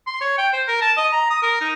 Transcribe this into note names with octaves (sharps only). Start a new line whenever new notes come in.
C6
C#5
G5
C5
A#4
A5
D#5
A#5
D#6
A#4
D#4